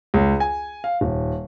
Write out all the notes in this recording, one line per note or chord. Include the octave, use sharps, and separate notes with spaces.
C#2
G#5
F5
D#1